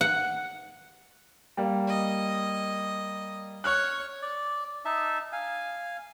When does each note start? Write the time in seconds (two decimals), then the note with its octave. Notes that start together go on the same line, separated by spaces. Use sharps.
0.01 F#5
1.57 G3 A#3
1.88 D#5
3.64 C#5 C#6 F6 F#6
4.22 D5
4.85 D#4 E5 A5
5.32 F5 G#5